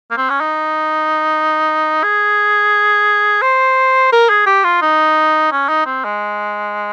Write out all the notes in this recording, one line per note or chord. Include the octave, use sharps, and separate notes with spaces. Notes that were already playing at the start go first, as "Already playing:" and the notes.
A#3
C4
C#4
D#4
G#4
C5
A#4
G#4
G4
F4
D#4
C#4
D#4
C4
G#3